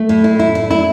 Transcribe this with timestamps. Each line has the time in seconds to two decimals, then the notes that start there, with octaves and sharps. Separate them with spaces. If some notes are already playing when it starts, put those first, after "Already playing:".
Already playing: A3
0.09 A2
0.24 E4
0.39 E4
0.55 E4
0.71 E4